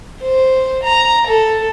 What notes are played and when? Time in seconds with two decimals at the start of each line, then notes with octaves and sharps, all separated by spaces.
0.21 C5
0.83 A#5
1.27 A4